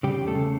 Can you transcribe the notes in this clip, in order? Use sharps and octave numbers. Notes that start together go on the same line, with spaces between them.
C#3 G3 G4
E2
A3 A4
C#3